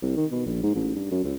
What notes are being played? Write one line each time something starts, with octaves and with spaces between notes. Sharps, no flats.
C2
D#3
B2
A#1
G#2
A1
G2
F#2
C#2